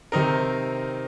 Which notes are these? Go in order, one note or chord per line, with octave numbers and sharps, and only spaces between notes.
C3 D#3 C4 D#4 A#4